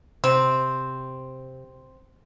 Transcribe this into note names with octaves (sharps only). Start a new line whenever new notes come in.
C3 C4